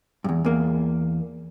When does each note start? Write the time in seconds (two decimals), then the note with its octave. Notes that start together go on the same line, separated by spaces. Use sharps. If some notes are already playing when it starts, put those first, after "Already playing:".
0.24 E2 G2
0.45 E2 A#3